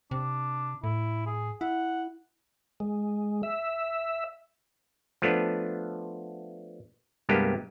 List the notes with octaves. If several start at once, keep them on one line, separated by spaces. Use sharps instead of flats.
C3 D4
A2 E4
G#4
E4 F#5
G#3
E5
F3 A3 B3 D4
C2 G2 G#3 A#3 B3 G4